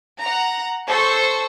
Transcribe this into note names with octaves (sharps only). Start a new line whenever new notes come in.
F#5 A#5
A4 C5 C#6 E6